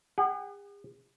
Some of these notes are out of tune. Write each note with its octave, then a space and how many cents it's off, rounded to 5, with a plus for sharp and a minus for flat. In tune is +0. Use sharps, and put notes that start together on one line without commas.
G#4 -45 F#5 +25